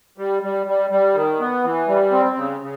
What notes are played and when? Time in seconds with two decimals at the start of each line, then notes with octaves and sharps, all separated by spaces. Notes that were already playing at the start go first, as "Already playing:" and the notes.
0.18 G3
0.43 G3
0.67 G3
0.90 G3
1.15 D#3
1.40 B3
1.64 E3
1.88 G3
2.11 C4
2.37 C#3
2.61 C#3